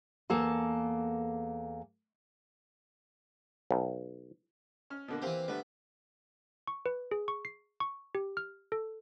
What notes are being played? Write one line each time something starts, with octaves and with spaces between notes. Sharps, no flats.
E2 A#3 A4 A5
B1
C#4 F6
B2 D3 A#3
E3 A#3 C4 G4 F5
D3 G3 A3 B3
C#6
B4
G#4
C#6
C7
C#6
G4
F6
A4